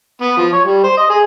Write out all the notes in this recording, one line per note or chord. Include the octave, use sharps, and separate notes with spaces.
B3
F3
C#5
G3
C5
D#5
G#4